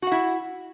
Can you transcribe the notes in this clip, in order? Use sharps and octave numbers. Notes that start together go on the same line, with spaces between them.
E4 F#4 F#5